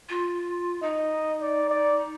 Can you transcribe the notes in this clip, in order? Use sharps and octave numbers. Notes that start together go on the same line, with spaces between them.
F4
D#4 D#5
D5
D5